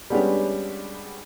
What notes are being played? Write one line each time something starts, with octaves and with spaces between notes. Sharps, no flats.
G3 G#3 B3 C#4 D4 G4